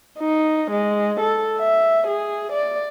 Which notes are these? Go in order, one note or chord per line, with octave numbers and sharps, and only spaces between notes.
D#4
G#3
A4
E5
G#4
D5